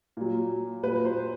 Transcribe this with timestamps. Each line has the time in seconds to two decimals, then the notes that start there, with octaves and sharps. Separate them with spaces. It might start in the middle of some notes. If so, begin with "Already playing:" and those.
0.17 A#2 F#3
0.83 A#2 F#3 B4
1.05 C5